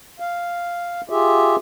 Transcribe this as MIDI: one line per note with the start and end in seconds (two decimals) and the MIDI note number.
0.20 1.01 77
1.10 1.56 65
1.10 1.56 67
1.10 1.56 68
1.10 1.56 76